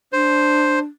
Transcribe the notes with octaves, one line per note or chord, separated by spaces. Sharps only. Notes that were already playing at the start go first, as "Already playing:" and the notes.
D4 C5